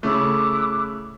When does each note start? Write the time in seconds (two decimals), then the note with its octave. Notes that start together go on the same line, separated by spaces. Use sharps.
0.03 C#3 A3 E4 D6 F#6